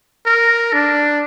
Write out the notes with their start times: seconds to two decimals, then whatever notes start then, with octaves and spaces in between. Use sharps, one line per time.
0.26 A#4
0.73 D4